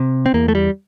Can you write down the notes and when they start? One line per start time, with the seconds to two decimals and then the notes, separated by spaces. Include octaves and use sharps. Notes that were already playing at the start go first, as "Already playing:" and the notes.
Already playing: C3
0.26 C4
0.34 E2 A#3
0.48 A3
0.55 G3